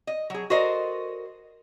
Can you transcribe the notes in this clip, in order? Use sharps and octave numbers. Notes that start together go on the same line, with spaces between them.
D#5
F#3 G#4
F#4 A4 A#4 C5 D5 D#5